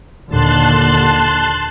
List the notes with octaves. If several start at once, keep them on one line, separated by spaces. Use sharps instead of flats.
D#2 A#2 D3 A5 C6 F#6